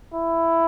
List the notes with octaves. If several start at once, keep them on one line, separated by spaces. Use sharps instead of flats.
E4